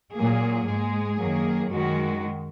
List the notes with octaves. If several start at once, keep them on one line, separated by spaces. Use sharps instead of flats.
A#2 F#3 A#3 G#4
G#2 G#3 G#4
F#2 D#3 F#3 A#3
F#2 D#3 G#3 F#4